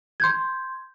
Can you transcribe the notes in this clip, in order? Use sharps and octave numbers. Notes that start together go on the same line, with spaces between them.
C6 G6 G#6